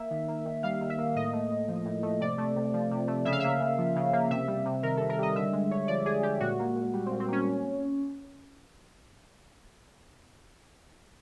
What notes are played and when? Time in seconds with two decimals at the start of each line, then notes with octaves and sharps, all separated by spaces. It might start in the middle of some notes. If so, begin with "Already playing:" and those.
Already playing: A#3 E5
0.11 D#3
0.28 A#3
0.45 D#3
0.63 G3 F5
0.81 D#3
0.90 E5
0.98 A#3
1.16 A2 D#5
1.33 A3
1.51 A2
1.68 F3
1.85 A2
2.03 A3
2.20 C3 D5
2.38 A3
2.56 C3
2.73 F3
2.91 C3
3.08 A3
3.25 C#3 E5
3.32 F5
3.40 A#3 E5
3.60 C#3
3.78 F3
3.96 C#3
4.13 A#3
4.31 C3 E5
4.48 G3
4.65 C3
4.83 D#3 A#4
4.97 C3 A4
5.09 A#4
5.18 G3 D#5
5.35 D3 E5
5.53 G#3
5.71 D3 C#5
5.88 F3 D5
6.05 D3 G#4
6.23 G#3 G4
6.40 A#2 F#4
6.59 A#3
6.76 A#2
6.93 G3
7.06 C4
7.11 A#2
7.20 C4
7.28 A#3 C#4